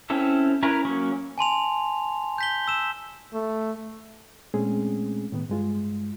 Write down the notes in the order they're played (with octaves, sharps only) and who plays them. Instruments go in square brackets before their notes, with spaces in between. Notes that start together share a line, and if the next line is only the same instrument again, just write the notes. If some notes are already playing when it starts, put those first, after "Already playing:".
[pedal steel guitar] C4 C#4 E4 A4
C#4 E4 A#4 B4 C#5
F#3 A#3 C#4 C#6
[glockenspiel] G#5 A5 C6 F7
G6 B6 G7
E6 E7
[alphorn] A3
[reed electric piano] A#2 G#3 A3 C4 C#4 G#4
A2 D#3 B3
G2 G#3 F4